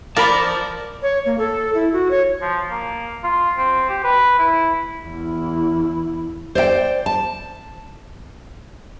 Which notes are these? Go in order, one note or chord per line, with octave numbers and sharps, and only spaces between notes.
F4 A#4 C5 D5 A5 B5
C#5
A#3
A4
E4
F#4
C#5
F3
A#3
F4
C4
G4
B4
E4
E2 E4
C5 D5 E5 G5
A5